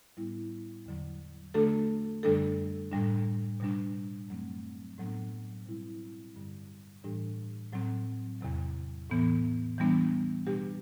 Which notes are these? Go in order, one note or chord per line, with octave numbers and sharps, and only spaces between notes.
A2 G3 B3 E4
E2 D3 F#3
D3 A3 D4 F#4 A4
F#2 D3 G3 D4 A4
A2 G3 D4
B2 G3 D4
F#2 F#3 A3 C4
A2 F#3 B3 D4
B2 G3 C4 E4
G2 D3 G3
A2 E3 G3 D4 G4
A2 F#3 C4
E2 C3 F#3
A2 E3 B3
E3 G3 B3 D4
B2 G3 D4 G4